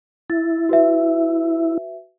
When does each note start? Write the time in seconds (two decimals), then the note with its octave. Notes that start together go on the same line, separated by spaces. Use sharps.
0.30 E4 A6
0.69 F#4 B4 E5